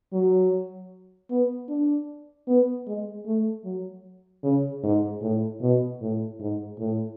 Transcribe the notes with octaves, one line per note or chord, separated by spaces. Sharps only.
F#3
B3
D4
B3
G#3
A3
F#3
C#3
G#2
A2
B2
A2
G#2
A2